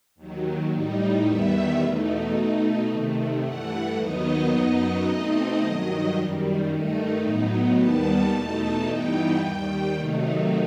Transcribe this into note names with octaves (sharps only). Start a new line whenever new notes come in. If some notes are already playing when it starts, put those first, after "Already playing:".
D#2 D#3 F#3
A2 G3 D#4
E2 D#3 G3 B3 E5
E2 B2 A3 D#4
B2 A3 D#4
C3 D#3 A3
G2 E3 A3 F#5
D#2 D#3 F#3 B3 D#4 D#5
F#2 F#3 B3 D#4 D#5
B2 A3 C4 D#4 D#5
G2 D#3 F#3
F#2 D#3 G3
G2 D#3 A3 D#4
A2 F#3 B3 D#4
D#2 D#3 G3 B3 A5
E2 B2 A3 D#4 A5
G2 E3 B3 D#4 G5
D#2 D#3 G3 G5
C3 D#3 F#3 A3 D#4